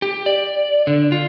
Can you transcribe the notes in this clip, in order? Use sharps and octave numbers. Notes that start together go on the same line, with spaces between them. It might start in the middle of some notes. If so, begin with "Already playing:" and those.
G4
D5
D3
F4